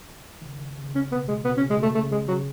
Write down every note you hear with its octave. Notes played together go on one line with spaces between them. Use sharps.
D#3
C#3
C#3
C#3 C#4
B2 B3
B2 G#3
B2 B3
C#4
C#3
G#3
B2
A3
B2
C#3 A3
C#3 G#3
C#3 F#3